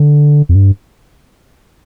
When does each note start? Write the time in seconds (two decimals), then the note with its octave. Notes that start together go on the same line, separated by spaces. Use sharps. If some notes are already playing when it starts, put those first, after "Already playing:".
Already playing: D3
0.49 F2
0.55 G2